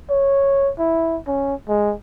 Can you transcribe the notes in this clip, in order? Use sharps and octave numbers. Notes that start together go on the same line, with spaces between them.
C#5
E4
C#4
G#3